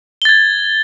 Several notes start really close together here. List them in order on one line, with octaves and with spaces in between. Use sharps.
G7 A6 G#6